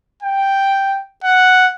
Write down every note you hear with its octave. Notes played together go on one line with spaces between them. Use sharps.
G5
F#5